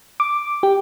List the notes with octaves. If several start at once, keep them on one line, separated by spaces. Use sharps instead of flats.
D6
G4